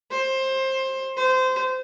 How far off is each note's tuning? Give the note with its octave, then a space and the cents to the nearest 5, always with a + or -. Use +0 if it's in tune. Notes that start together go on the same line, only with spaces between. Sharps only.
C5 +20
C5 -20